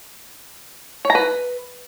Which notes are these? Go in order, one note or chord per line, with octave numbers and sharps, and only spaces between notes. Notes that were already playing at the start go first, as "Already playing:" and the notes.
C#5
A#5
B4